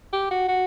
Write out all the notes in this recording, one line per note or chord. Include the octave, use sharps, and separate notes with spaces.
G4
F#4
F#4